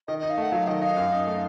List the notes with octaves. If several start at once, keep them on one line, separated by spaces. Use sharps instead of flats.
D#3 D#5
D#4 D#5
F5
A3 F#5
F#3 F5
D#3 D#5
D#4 F5
F#2
D#4
A3